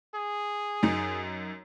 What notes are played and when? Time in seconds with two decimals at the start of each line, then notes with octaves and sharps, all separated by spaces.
0.15 G#4
0.83 F#2 D#4